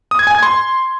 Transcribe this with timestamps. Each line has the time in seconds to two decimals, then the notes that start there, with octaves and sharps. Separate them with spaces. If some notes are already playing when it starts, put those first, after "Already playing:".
0.11 D#6
0.19 G#6
0.27 G#5
0.35 G#6
0.43 C6